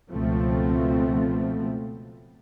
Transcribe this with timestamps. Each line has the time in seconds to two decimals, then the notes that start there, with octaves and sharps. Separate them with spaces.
0.11 C#2 B2 F3 A3 B3 C4